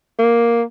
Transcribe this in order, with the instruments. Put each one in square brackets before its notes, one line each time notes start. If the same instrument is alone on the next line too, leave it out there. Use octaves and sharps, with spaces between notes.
[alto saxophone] A#3